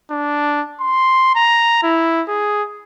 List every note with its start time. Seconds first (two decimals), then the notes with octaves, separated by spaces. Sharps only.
0.11 D4
0.80 C6
1.35 A#5
1.83 E4
2.28 G#4